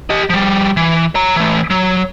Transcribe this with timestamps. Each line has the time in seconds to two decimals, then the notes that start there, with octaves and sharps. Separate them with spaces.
0.10 G4 D#5
0.30 F3 G3
0.77 E3
1.15 C#5 A#5
1.36 E3 A3
1.70 F#3